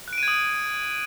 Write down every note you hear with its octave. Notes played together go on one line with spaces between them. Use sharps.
F#6
D7
D#7
G#6
D#6